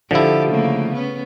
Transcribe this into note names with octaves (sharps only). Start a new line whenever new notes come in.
D3 F3 E4 G4 A4
C#3 A3 A#3
B3 C#4